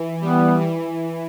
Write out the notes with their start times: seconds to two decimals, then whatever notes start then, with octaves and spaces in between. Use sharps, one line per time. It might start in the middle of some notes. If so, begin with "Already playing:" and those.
Already playing: E3
0.21 G3 B3
0.61 E3